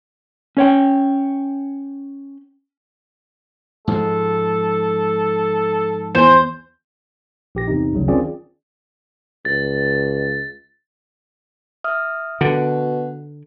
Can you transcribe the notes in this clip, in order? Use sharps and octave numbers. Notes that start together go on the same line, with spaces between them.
C#4 C#5 G5
G#2 F3 G#3 A4
E2 C5 G#5
A#1 G4 A#6
E2 C3 D#4
A1 D2 C#3 F#3 G3
D#3 C4 C#4 F4 G#4 D5
C#2 A6
E5 D#6 F6
B2 D3 F#5